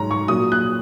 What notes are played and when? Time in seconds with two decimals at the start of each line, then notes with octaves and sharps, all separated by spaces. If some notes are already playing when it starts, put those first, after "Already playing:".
Already playing: G#2 F#3 C#5 A#5
0.11 C#6
0.28 A#2 F#3 D#6
0.52 F#6